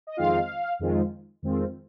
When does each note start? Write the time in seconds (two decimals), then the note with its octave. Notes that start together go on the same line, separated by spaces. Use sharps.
0.07 D#5
0.17 F2 D#3 G#3 C4 F4 F5
0.79 F2 D#3 G#3 C4 F4
1.43 F2 D#3 G#3 C4 F4